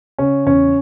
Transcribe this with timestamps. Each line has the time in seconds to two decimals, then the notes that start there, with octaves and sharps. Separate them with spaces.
0.19 C#3 C#4
0.46 E2 C#4